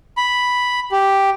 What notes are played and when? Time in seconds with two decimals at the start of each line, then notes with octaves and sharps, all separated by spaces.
0.17 B5
0.92 G4